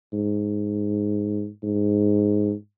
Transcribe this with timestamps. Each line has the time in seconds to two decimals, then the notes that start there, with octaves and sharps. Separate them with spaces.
0.13 G#2
1.63 G#2